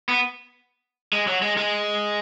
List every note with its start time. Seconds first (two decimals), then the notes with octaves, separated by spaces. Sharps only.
0.09 B3
1.13 G#3
1.27 F#3
1.42 G#3
1.57 G#3